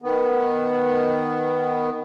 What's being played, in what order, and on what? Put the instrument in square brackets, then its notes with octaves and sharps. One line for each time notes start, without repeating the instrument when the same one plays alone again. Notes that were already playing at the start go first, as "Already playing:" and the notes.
[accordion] D#3 B3